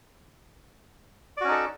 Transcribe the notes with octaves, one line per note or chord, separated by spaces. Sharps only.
C#4 D#4 F#4 A4 D5